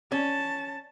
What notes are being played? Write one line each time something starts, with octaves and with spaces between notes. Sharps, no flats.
C#4 A5